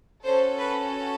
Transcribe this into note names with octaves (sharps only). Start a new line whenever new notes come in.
C#4 F#4 A4 C5
B4